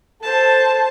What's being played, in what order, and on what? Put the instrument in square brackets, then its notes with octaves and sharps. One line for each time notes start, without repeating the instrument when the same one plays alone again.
[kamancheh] A4 C5 [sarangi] A5